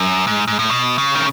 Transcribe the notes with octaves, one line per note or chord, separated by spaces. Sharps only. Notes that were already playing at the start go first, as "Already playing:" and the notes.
Already playing: F#2
G#2
G#2
A2
B2
C#3
D#3